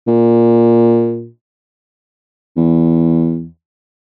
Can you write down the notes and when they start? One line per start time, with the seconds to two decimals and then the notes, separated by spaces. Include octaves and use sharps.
0.07 A#2
2.57 E2